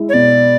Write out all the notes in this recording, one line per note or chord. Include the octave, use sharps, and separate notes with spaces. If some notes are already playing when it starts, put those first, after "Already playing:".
Already playing: G#3 E4
C#5
B2 D5